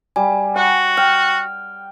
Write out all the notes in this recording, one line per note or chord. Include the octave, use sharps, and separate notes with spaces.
G3 G#5
F#4 F#5
G5 F6